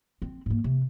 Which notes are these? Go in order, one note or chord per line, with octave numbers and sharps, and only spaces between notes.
C4
G#2 A#3
C3